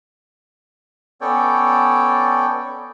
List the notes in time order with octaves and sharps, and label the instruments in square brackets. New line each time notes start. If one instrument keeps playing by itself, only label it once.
[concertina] B3 C#4 A4 C#5 D5 G5